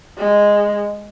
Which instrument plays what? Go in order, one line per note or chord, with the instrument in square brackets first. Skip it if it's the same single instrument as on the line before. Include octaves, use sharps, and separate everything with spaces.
[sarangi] G#3